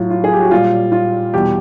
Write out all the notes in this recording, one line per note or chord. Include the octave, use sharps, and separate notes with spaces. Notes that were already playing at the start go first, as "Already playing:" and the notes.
Already playing: A2 F#3 F4
F4
G#4
G4
F#4
A#2 G3 F4
F4
E2 B2 G3 G4